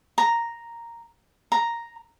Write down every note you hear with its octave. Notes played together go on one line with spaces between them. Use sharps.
A#5
A#5